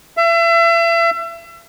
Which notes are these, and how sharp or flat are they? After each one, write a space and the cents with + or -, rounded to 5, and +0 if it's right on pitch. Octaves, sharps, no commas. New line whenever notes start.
E5 +35